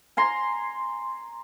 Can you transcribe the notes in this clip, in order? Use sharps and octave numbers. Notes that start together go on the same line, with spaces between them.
G#5 A#5 C6